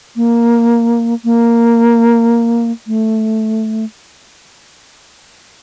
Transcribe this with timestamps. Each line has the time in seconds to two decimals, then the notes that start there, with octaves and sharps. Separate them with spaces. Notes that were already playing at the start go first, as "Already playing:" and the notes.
0.16 A#3
1.25 A#3
2.87 A3